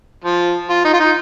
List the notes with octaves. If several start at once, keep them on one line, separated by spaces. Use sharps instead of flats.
F3
F4
D#4
F4
D#4